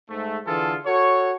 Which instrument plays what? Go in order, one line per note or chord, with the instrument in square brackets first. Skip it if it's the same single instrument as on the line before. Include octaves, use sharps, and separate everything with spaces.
[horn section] G#2 A3
D3 E3 F4 G#4 A4
F#4 A4 C#5